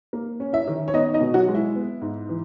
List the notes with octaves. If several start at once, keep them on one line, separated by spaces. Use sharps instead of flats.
A#3
C#4
E4 E5
D#3
C#5
B3 D#4 D#5
D#4 D#5
B2
F#3 F#4
G#3
E4
B3
G#2
E3